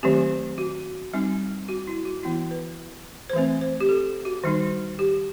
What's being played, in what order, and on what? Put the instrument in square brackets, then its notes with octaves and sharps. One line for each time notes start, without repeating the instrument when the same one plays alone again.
[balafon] D#3 F#3 A3 C4 G4
F#4
G3 C4 D#4
F#4
E4
F#4
E3 B3 E4
B4
C5
E3 A3 C4 B4
C5
G4
A4
F#4
D#3 G3 D#4
G4